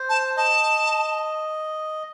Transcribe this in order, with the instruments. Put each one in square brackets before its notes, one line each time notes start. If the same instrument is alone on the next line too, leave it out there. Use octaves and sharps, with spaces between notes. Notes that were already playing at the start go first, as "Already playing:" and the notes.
Already playing: [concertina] C5
[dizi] A5
[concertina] D#5 [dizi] A5